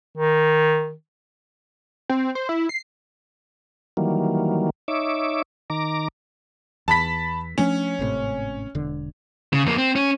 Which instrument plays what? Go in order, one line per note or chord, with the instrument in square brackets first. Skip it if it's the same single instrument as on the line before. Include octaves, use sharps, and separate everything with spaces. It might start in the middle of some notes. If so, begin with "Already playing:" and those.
[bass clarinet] D#3
[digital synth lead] C4
C5
E4
C7
[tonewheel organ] D#3 E3 F#3 G3 A#3
D#4 C#5 E5 D6
D#3 A#5 D6
[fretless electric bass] E2 [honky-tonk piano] A5 B5 B6
[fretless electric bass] F3 A3 D4 [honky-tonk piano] C#4
[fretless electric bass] G#1 A2 C3
E1 D3
[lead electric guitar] C#3
F2 A#3
C4
C#4